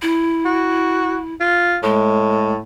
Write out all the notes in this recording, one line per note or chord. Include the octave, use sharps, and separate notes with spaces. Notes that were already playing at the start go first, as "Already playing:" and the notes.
E4
F#4
F4
A2 G#3